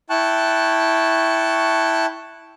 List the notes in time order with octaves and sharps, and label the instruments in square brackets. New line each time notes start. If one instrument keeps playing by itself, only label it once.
[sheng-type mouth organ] E4 G5 A5 C#6 F#6